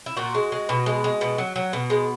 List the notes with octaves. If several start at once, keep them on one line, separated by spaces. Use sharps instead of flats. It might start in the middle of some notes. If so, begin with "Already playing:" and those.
E4
A#2 F#4
G#3
G#3
B2
G#3
G#3
B2
F#3
F#3
B2
G#3